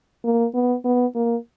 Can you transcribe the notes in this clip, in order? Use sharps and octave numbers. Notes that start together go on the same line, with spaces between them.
A#3
B3
B3
A#3